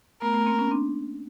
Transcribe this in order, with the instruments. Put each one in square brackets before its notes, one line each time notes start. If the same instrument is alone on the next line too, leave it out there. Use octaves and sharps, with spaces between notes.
[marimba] A3 B3 [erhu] A#4
[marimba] A3 B3
A#3 C4
B3 C#4
C4 D4